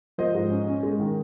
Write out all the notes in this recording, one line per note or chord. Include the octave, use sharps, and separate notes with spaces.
F3 C5 D#5
G#2
C#4
C#4
G#3
D#3